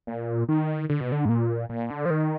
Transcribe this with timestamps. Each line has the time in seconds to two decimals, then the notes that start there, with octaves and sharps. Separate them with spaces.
0.07 A#2
0.49 D#3
0.89 D3
1.01 B2
1.12 D3
1.25 G#2
1.29 A#2
1.69 A#2
1.90 D3
2.05 F3
2.10 D#3